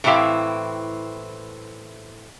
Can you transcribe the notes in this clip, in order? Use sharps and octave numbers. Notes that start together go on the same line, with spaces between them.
A2 E3 C4 E4 G4 F5